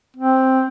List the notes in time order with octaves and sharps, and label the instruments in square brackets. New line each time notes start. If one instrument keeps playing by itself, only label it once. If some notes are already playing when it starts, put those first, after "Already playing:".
[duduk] C4